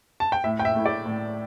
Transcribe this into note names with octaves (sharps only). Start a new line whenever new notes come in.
A5
G5
A2 E5
G5
E5
A3 E4
D5
A2